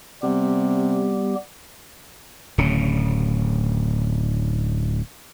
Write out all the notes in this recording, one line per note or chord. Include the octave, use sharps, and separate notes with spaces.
C3 G3 B3 G4
D1 C#3